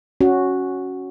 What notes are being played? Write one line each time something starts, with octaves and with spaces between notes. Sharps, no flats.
C#4 F#4